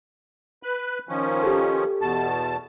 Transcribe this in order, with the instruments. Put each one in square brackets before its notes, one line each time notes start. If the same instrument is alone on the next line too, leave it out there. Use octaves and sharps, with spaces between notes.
[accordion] B4 F#6
D#3 F3 C#4
[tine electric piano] G4 A4
[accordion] E2 B2 A5